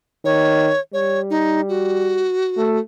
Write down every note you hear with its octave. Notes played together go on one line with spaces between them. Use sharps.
D#3 C#5
G3 C#5
D#4
F#4
A3